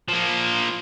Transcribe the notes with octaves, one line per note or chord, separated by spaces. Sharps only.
F3 A#3